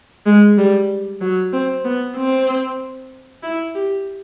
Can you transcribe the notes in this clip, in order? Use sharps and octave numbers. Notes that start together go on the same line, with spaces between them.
G#3
G3
F#3
C4
B3
C4
E4
G4